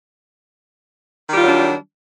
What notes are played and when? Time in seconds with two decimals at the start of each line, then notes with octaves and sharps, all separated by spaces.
1.27 D#3
1.32 G3
1.37 F4
1.41 F#3
1.46 D4